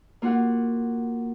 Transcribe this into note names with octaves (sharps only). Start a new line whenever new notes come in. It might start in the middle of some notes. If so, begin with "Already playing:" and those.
A#3 F4 F#4 F#5